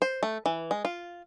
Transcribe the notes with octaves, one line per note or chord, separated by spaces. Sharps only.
C5
A3
E3
G#3
F4